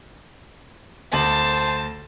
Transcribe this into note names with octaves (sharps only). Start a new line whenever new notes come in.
D2 C5 A5 F#7